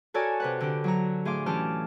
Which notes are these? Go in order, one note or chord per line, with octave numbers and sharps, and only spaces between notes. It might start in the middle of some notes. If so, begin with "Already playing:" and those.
F#4 A4 A#4 C#5 D5 G#5
C3 B4 F#5
D3 G4
F#3 F#4 A#5
A2 G#4 F5 C6 D6
E3 C#4 G4 A5 D6 F6